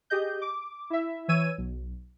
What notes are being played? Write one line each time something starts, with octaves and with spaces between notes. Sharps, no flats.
G4 G#4 D#5 G6
D6
E4 E5
E3 C#5 E6 G#6 D#7
B1